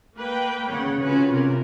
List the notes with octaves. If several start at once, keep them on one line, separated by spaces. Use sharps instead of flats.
A#3 B4 G5
C#3 C#5 F#5
C#4 F4 F#4 B4
C3 A#4